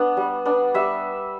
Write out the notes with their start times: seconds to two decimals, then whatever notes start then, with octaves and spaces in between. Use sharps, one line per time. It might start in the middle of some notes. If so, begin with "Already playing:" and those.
Already playing: B3 D4
0.17 G3
0.45 B3 D4
0.74 G3 E5